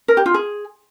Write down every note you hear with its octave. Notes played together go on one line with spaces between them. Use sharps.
A#4
G4
F4
G#4